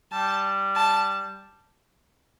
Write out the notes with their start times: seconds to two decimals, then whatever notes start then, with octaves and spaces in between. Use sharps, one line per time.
0.12 G3 A5
0.76 A5